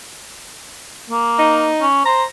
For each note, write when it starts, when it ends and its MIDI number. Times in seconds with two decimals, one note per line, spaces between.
1.11 1.69 58
1.39 1.84 63
1.81 2.04 61
2.06 2.23 72
2.06 2.25 82